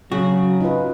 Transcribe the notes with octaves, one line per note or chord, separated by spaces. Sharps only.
C#3 F#3 F#4
D#4 F4 B4